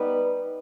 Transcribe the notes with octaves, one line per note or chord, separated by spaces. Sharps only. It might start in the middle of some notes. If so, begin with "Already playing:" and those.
Already playing: G3 B3 D#4 B4